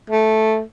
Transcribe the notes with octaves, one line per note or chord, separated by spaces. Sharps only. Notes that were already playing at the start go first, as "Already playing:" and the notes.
A3